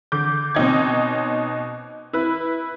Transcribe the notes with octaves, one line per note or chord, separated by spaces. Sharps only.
D3 D6 G6
B2 C4 C#4 D#4 G5 G#6
E4 B4